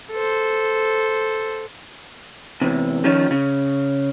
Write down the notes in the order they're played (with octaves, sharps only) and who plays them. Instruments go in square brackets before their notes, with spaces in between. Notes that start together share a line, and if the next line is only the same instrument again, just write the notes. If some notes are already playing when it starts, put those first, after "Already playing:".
[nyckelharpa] A4 C5
[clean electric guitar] E2 C3
D#3 F3 C#4 F4
C#3